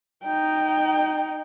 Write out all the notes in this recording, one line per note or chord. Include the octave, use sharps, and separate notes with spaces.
D#4 G5